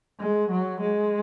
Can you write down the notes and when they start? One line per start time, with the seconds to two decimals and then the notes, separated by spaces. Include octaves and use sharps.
0.20 G#3
0.50 F#3
0.81 G#3